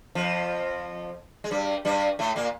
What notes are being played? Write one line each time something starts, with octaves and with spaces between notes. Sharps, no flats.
F2 F3
G#3
G2 G3
G2 G3
A2 A3
A#2 A#3